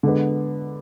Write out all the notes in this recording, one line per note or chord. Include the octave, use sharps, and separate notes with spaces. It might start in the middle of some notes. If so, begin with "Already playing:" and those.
D3 G#3 B3